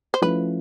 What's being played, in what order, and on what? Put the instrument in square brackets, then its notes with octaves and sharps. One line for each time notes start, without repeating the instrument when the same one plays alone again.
[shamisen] C5
[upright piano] F3 A3 C#4 E4 [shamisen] B4